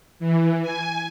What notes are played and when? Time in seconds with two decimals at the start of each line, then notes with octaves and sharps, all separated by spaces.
0.20 E3
0.62 G#5